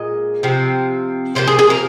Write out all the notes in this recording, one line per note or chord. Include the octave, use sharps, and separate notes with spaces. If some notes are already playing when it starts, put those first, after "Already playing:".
Already playing: A#2 G#3 D#5
C3 F3 C4
C3 F3 A#3 C5
G#4
G#4
A#4